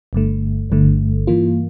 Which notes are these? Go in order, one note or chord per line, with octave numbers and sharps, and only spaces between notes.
G1 G2 D3 A3
G1 G2 D3 A3
G2 E3 A#3 F4